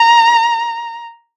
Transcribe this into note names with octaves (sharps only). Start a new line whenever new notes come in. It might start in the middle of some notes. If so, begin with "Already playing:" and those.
Already playing: A#5